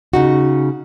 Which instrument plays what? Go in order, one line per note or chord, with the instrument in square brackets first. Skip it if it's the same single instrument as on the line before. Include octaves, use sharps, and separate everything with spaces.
[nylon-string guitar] C#3 D#4 F#4